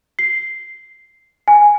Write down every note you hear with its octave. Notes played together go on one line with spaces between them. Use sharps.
C7
G#5